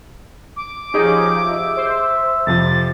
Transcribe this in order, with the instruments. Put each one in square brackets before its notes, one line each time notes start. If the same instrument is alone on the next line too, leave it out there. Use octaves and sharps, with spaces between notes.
[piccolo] D6
[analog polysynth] F3 D#4 [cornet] C#4 [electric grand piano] G4 G#4 D#5
[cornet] E5
[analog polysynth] C5
[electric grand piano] F2 C3 F3 [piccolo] A6